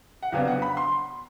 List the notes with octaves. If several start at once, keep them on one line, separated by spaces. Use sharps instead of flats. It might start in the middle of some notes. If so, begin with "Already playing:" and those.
F#5
F2 C#3 F#3 B3 D4 F5
F#5
B5
C6